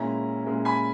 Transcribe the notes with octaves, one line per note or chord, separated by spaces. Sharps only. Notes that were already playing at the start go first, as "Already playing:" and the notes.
Already playing: A#2 G#3 C#4 E4 A#5
A#2 G#3 C#4 E4
G#5 B5